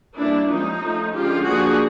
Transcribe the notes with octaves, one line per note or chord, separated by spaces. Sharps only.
E3 G3 A#3 D4 E4
F3 G#3 C#4 D#4
F3 A3 C#4
D3 F3 G#3 C#4 F4 G4
F3 A#3 D4 F#4 G#4